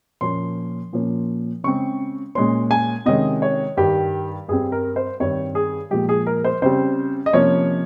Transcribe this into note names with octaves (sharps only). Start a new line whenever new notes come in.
A#2 F3 A#3 C#4 C6
A#2 F3 A#3 C#4
C#3 G#3 C4 C#6
A#2 G#3 C#4 C6
G#5
C3 D#3 G#3 C#4 D#5
C#5
G2 D#3 G3 G4
G2 G3 C4 G#4
A#4
C5
G2 D#3 G3 C4 C#5
G#4
A#2 F3 G#3 G4
G#4
A#4
C5
C#3 G3 C4 C5
D#5
C3 F3 A#3 C#4 C#5